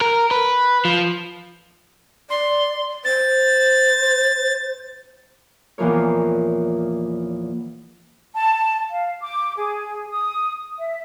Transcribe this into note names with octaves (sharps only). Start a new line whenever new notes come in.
A#4
B4
F3
D5 C6
C5 A6
E2 A#2 E3 F3 A#4 C#5
A5
F5
D6
G#4
D#6
E5